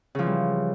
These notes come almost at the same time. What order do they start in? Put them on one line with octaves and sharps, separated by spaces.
C#3 F3 E3 G3